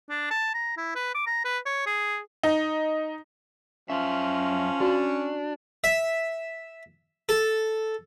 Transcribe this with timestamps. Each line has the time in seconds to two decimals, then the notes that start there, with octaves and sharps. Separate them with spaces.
0.10 D4
0.31 A5
0.54 A#5
0.77 E4
0.95 B4
1.15 D6
1.27 A#5
1.45 B4
1.66 C#5
1.86 G#4
2.43 D#4
3.90 F#2 F3 C#4 E5
4.81 D4 F#4
5.84 E5
7.29 A4